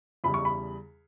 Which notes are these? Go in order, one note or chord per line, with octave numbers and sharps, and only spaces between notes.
E2 C#3 G3 B5
C#6
B5